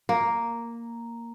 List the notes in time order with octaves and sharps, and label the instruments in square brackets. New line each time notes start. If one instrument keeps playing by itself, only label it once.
[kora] A#3